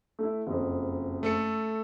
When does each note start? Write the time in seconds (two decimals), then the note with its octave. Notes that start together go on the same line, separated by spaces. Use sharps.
0.19 A3 E4
0.47 F#1 F2
1.23 A3 A4 C#7